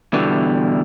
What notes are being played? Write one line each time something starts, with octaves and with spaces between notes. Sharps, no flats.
E2 B2 D3 E3 G3